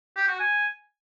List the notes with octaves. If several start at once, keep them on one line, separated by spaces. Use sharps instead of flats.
G4
F#4
G#5